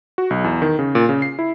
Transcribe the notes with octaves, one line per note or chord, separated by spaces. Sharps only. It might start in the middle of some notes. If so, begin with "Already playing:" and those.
F#4
B1
E2
D#3
C#3
A#2
C#3
C7
E4